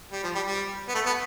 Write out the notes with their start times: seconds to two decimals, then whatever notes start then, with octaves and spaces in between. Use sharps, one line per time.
0.12 G3
0.24 F3
0.35 G3
0.47 G3
0.88 B3
0.95 A3
1.06 B3